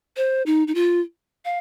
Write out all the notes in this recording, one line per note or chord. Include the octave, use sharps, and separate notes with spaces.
C5
D#4
D#4
F4
F5